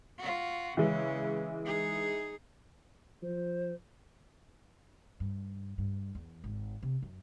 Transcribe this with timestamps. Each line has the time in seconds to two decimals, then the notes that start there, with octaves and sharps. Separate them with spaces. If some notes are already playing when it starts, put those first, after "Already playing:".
0.18 F4 F#4
0.77 C#3 E3 G#3 C#4
1.66 D#4 G#4
3.22 F3 C5
5.20 G2
5.78 G2
6.15 E2
6.44 G#1
6.83 C3
7.02 F#2